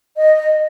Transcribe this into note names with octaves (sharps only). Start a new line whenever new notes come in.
D#5